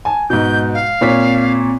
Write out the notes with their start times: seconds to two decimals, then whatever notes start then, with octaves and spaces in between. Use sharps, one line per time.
0.05 G#5 A5
0.30 G#2 B2 G6
0.74 F5
1.01 A#2 C4 C#5 B6